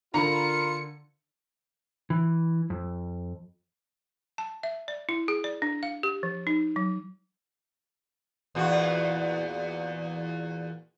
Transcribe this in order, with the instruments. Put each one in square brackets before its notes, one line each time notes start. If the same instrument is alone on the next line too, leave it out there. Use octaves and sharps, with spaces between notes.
[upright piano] D3 [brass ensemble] F4 A#4 [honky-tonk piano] A#5 B5 [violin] C#7
[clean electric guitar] E3
F2
[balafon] A5
E5
D5
E4
G#4
D5
D4
F5
G4
F3
D#4
F#3
[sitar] E2 A#2 F#4